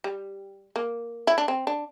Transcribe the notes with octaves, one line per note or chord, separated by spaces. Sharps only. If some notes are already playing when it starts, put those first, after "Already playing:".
G3
A#3
E4
D4
C4
D4